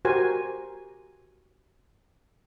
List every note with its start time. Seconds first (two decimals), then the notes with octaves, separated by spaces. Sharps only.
0.05 F#4 G4 A#4 C5 G#5